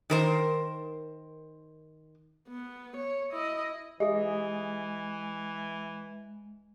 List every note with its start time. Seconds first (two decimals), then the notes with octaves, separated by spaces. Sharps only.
0.10 D#3 A#4 C5
2.49 B3
2.97 C#5
3.32 E4 D#5
4.00 E3 G#3 G4 G#4 D#5 E5